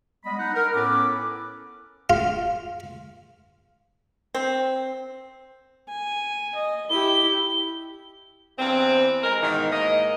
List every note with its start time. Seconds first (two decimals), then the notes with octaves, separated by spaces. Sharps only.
0.25 G3 G#3 B3 D#5 B5
0.39 D#4 F#5
0.55 A#4
0.74 A2 B3 C#4 A4 B4 D6
2.10 F4
4.34 C4
5.89 G#5
6.55 D#5
6.90 E4 G4 G7
8.58 E2 G2 C4
9.22 G#3 A#4
9.42 G#2 B2 D#3 E3
9.72 G#2 A#3 D#5